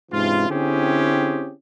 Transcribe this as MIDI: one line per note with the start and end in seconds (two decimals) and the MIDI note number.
0.11 0.47 44
0.11 0.47 48
0.11 0.47 52
0.11 0.47 61
0.11 0.47 65
0.50 1.51 50
0.50 1.51 60
0.50 1.51 61
0.50 1.51 64
0.50 1.51 67
0.50 1.51 68